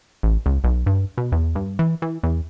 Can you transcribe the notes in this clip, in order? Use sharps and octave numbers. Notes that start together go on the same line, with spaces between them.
A1
C#2
B1
G2
B2
E2
G2
E3
E3
E2